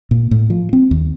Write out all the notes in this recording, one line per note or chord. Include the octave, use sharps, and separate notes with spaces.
A#2
A2
F3
C4
D#2